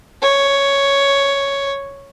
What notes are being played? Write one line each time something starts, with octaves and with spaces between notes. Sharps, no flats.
C#5